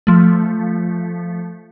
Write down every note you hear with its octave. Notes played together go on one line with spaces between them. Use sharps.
F3 A3